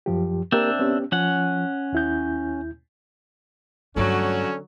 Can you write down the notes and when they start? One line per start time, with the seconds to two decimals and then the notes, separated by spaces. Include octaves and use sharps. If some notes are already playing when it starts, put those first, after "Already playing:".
0.06 F#2 F3 G4
0.52 A#3 C4 D4 G4 A#4 E5
0.79 B3 C#4 G4
1.12 F3 C#4 F#5
1.92 D#2 E4 G6
3.96 G2 D3 F#3 A3 C#4 F#4